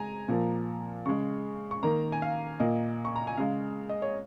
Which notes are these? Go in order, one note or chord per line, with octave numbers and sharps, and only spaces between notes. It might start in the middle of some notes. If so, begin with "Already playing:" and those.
Already playing: G#3 G#5 A#5
A#2 F3 A#3
C#3 G#3 C#6
C#6
D#3 A#3 A#5
G#5
F5
A#2 A#3 D#5
C#6
A#5
G#5
C#3 G#3 F5
D#5
C#5